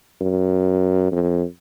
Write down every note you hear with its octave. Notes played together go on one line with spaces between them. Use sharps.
F#2
F2